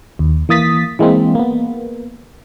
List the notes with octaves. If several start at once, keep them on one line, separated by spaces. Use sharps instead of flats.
D#2
E3 A#3 D#6 A6 B6
E3 G#3 A#3 C4
A#3 B3